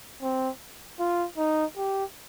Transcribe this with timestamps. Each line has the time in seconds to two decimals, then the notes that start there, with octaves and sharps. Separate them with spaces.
0.22 C4
1.00 F4
1.38 D#4
1.77 G4